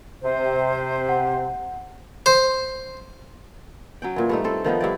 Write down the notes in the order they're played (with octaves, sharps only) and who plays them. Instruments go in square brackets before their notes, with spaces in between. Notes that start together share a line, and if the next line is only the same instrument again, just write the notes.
[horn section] C3 [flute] C5
[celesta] F#5
[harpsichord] C5
[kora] F#3 C#4 G5
A#2 E3
G2 A3 D#4
C4 A4
D#3 F3 B3 D#4
G2 E4 D5